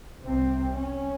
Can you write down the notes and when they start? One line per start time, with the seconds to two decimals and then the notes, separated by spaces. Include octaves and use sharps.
0.23 C2 C3 C4
0.75 C#4